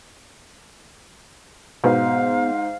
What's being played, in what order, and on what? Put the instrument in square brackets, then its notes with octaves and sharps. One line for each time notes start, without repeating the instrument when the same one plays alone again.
[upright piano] G#2 [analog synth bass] B2 [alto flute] F5